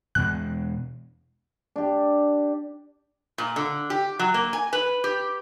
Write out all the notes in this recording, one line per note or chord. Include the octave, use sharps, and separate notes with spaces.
E2 B2 G#3 F#6
D4 G4
A#2
D3
G4
F#3
A#3
G#5
B4
G4